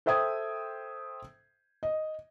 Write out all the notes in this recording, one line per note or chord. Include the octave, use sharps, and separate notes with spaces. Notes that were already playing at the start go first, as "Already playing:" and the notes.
A4 C5 E5 G5 D#6 G#6
D#5